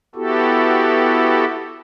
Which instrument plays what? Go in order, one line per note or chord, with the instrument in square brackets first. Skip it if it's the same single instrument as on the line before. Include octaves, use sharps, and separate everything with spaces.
[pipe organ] B3 E4 F#4 G4 A4